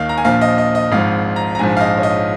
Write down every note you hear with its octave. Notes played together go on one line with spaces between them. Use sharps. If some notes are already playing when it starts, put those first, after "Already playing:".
Already playing: D#2 D#3 D#5 F5
A#5
G#5
A#1 A#2 F3 F5
D#5
D#5
D#5
G#1 G#2 F3 F5
A#5
A#5
A#1 G#2 F3 G#5
F5
D#5
C#5
D#5